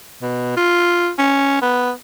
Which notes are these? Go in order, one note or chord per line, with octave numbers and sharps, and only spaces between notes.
B2
F4
C#4
B3